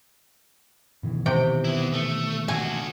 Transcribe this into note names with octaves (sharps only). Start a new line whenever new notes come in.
B2 D#3 E3
C3 G5
B3 E4
A3
F#4 A4 G#5